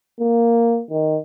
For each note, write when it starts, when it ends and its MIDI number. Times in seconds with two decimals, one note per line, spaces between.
0.20 0.82 58
0.90 1.19 51